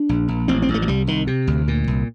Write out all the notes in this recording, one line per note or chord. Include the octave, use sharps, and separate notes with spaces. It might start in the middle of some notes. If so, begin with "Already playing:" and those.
Already playing: D4
A#1
A#1
A1 C4
C4
A1
A3
F3
C2 G3
C2 D#3
C3
D2
A#2
C2